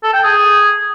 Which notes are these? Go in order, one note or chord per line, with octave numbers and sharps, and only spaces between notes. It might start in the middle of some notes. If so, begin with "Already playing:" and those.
A4
G5
G#4